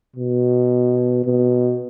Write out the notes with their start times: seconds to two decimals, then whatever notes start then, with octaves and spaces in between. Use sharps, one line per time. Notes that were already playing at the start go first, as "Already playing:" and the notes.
0.16 B2
1.25 B2